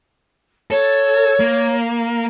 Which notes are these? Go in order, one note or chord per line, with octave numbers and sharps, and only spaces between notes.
A4 C#5
A#3